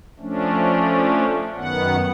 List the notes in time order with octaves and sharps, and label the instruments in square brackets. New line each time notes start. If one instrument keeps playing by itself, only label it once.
[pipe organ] F3 A3 C#4 D4
F#2 D#3 B3 F#5